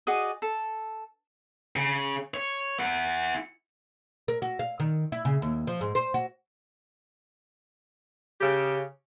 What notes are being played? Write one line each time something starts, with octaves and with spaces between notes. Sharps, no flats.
F#4 G#4 D5 D#5
A4
C#3
C#5
E4 F#5
A#4
F#4
F5
D#3
E4
C#3
D#2
F3
G#2
C5
F#4
C#3 G4